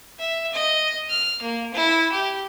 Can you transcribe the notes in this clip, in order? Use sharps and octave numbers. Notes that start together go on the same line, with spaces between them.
E5
D#5
F6
A#3
E4
G4